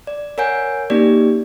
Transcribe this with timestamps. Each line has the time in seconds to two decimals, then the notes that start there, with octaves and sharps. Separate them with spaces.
0.07 D5
0.38 A#4 C#5 F#5 G#5 G6
0.90 A#3 C#4 D#4 G4 D5